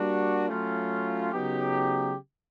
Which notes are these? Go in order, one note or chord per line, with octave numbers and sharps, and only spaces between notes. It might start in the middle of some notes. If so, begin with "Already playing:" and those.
Already playing: G3 A#3 D4 F#4
F#3 A3 C#4 F4
C#3 F#3 B3 D#4 G4